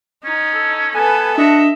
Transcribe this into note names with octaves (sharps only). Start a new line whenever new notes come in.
C#4 D#4
A4
B3 A4 B4 G#5
D4 F#4 D#5 E5